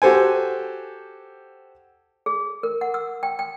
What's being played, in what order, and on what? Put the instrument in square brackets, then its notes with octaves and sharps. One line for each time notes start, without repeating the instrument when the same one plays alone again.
[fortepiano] F#4 G4 A4 C5 G#5
[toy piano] G#4
A#4
F#5
E6
G5
G5